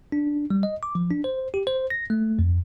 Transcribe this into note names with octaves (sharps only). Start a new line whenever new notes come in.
D4
G3
D#5
D6
F3
D4
C5
G4
C5
A#6
A3
F2